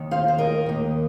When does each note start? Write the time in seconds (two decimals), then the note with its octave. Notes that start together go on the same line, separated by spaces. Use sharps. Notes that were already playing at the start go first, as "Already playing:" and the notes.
Already playing: D#2 D#3
0.11 C5 F5
0.28 C5
0.38 A#4 D#5
0.66 D#2 D#3